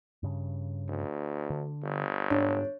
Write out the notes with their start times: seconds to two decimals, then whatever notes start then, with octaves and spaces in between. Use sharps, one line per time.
0.23 G2 C#3
0.89 D2
1.50 D3
1.82 G1
2.31 G#2 D4 C#5